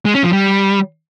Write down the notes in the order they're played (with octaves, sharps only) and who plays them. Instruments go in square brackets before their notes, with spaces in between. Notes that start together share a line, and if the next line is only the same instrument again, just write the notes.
[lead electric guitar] G#3
C#4
F3
G3